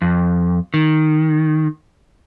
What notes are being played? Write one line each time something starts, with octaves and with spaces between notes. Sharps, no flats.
F2
D#3